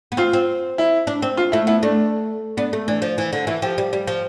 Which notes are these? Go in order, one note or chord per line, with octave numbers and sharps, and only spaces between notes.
B3
C4 F4
C4
E4
D4
C4
F4
A3 E4
B3 E4
A3 D4
B3 D4
A3
E3 D4
F3
E3
D3
E3 E4
F3 G4
G3
G3
F3